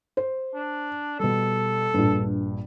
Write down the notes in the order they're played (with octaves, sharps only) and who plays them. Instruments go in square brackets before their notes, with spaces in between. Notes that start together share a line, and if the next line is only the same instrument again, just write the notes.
[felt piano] C5
[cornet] D4
[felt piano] B2 G3 [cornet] A4
[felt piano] A#1 G2